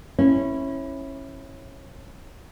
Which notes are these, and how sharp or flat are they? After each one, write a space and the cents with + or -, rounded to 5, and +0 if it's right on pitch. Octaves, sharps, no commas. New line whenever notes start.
C#4 -25 E4 +0